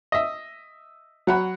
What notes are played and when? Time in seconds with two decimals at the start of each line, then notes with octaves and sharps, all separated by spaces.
0.12 D#5 E5
1.27 F#3 F#5 B5